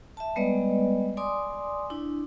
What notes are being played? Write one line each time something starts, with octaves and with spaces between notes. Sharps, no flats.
E5 A5
G3 G#3 B3 B4 D5 D#5
D5 G#5 C6 D6 D#6
D4 E4